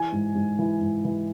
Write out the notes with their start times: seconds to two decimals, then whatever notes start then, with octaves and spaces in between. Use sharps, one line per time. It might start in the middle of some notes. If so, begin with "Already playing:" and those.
Already playing: E3 G#5
0.12 G#2
0.35 G#2
0.59 E3
0.81 G#2
1.05 E3